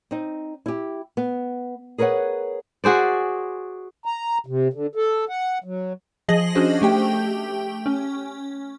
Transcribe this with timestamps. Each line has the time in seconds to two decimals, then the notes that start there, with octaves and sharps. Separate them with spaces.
0.11 C4 D#4
0.66 E4 G4
1.17 B3
1.98 G#4 A#4 B4 C#5 F#5
2.84 F#4 G#4 C5 D5
4.06 A#5
4.46 C3
4.73 D3
4.95 A4
5.29 F#5
5.64 F#3
6.28 F3 G#4 D#5 A#6 F#7
6.55 C#4 D4 F#4 G#4 C5
6.82 A3 G4 G5
7.86 C#4